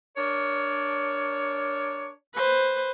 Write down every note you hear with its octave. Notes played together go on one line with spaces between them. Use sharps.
D4 A#4 C#5
B4 C5